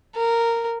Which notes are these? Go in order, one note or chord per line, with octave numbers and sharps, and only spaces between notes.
A#4